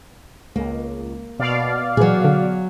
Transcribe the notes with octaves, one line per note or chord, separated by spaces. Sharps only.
C#2 A#3
B2 D5 F5
A#2 E3 F#3 G#4
D3